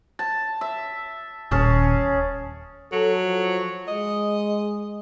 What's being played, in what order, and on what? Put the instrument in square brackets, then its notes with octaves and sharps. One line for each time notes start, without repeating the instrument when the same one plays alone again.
[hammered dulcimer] A5
E5
[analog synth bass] D#1 [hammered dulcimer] C#4 G#4 A5
[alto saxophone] F#3 [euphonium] A4
[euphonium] F3
[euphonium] G#3 [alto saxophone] D#5